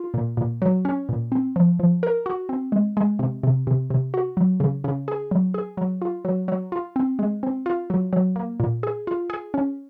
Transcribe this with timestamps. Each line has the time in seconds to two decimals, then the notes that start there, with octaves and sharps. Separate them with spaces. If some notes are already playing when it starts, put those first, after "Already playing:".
Already playing: F4
0.14 A#2
0.37 A#2
0.62 F#3
0.85 C#4
1.09 A#2
1.32 C4
1.56 F3
1.79 F3
2.03 A#4
2.26 F#4
2.49 C4
2.72 G#3
2.97 G#3
3.19 C3
3.43 C3
3.67 C3
3.90 C3
4.14 F#4
4.37 F#3
4.60 C#3
4.84 C#3
5.08 G#4
5.31 F#3
5.54 G#4
5.77 F#3
6.02 F4
6.25 F#3
6.48 F#3
6.72 F4
6.96 C4
7.19 G#3
7.43 C4
7.66 F4
7.90 F#3
8.13 F#3
8.36 A#3
8.60 A#2
8.83 G#4
9.07 F4
9.30 G#4
9.54 C#4